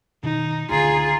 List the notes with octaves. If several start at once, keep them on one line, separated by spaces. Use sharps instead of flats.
B2 D#3 D#4
C#2 D3 F4 G#4 A#5